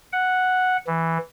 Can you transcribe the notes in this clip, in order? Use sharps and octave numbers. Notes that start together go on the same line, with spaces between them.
F#5
E3